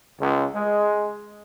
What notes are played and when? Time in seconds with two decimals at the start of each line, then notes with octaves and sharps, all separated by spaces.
0.21 C#2
0.55 G#3